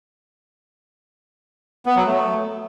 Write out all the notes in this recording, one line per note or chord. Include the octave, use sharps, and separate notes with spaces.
B3
F#3
A3